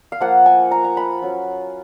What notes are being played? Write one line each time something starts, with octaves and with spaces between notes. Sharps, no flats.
F5
F3 A#3 F4 F#5
G#5
A#5
A#5
B5
F#3 C#4 F4